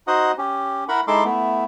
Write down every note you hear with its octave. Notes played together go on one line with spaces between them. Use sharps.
D#4 F#4 C5 D#5 F#5 D#6
C#4 G4
E4 A#4 F#5 B5 C#6
G#3 D#4 E4 A4 C6 D6
A3 B3 E4